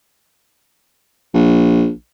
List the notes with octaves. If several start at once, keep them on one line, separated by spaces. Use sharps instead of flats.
A#1